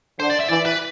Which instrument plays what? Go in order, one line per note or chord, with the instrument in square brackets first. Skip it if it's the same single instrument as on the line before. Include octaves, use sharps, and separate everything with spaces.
[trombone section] D3 [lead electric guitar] C5
[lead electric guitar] D5
E5
[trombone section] E3 [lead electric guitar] D5
[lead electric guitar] B4